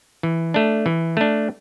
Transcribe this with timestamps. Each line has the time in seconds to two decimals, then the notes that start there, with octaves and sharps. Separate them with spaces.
0.23 E3
0.54 A3 D4
0.86 E3
1.17 A3 D4